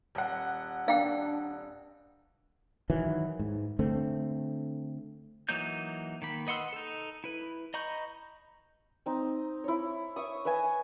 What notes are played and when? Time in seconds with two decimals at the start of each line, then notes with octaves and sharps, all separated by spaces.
0.15 D#1 F#5
0.88 D4 F5 G5
2.90 D#3 E3 F#3
3.39 G#2
3.79 D3 A3 C4
5.49 E3 F#3 A#3 D#4 G6
6.22 D#3 A#3 B5
6.47 B4 D#5 F#5 C6 E6
6.73 D#4 A4
7.24 E4 B4
7.74 D#5 A#5 B5 C#6 G6
9.06 C4 D#4
9.64 E4 C#5
10.16 E5 C#6 D#6
10.45 B4 D#5 E5 G#5